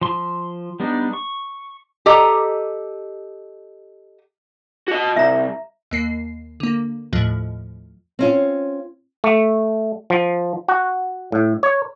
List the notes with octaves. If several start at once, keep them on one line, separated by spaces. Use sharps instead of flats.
F3 C6
G3 B3 D4 D#4
C#6
G4 A4 D#5 A#5
F#4 D#5
C2 E5 A#5
D#2 A#3 C7
D3 A#3
D#2 A2 F3 A3
C4 C#4 F4
A3
F3
F#4
A2
C#5